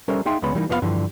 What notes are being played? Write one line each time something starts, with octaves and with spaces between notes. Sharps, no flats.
G3 C#4 A4 A#4 C5 E5
A#3 D#4 G#4 E5 G5 C6
D2 C#3 G#3 B3 C#4 B5
E3 G3 A#3 D#4
F2 F3 B3 F4 F5 B5
G2 D3 E3 F3 G3